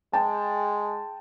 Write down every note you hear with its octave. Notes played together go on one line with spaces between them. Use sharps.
G#3 G5 A5